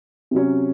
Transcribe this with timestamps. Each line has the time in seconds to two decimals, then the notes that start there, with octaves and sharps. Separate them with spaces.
0.31 C3 F#3 C#4